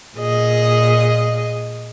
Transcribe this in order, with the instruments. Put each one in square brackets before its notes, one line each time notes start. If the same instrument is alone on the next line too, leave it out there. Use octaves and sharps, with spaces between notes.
[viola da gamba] A#2 G#4 D#5